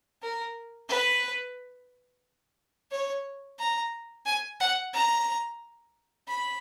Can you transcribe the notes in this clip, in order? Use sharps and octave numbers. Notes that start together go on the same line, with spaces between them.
A#4
B4
C#5
A#5
G#5
F#5
A#5
B5